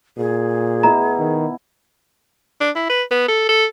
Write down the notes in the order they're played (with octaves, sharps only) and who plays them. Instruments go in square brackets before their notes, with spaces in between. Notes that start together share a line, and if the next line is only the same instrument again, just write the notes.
[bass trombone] A#2 [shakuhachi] G#4
[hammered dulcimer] B2 E4 [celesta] A#5
[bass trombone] D#3
[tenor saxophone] D4
E4
B4
B3
A4
A4